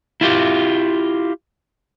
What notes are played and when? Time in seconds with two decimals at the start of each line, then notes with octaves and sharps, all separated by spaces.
0.21 E4 F4 G4